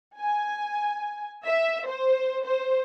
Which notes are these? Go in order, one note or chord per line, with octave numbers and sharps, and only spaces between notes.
G#5
E5
C5
C5